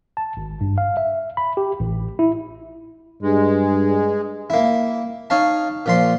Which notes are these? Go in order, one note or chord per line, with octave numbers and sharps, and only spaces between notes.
A5
G#1
G2
F5
E5
B5
G4
A1
E4
G2 G#3
A#3 E4
D#4 C#5 F5 A5
A#2 F3 C6